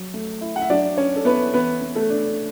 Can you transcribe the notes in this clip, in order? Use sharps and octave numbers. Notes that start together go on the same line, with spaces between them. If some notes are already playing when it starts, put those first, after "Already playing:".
Already playing: F#3
A3
E4
F#5
E5
F#3 D4 D5
C#4 C#5
A4
B3 E4 B4
E3 B3 B4
B3
A3 A4
D4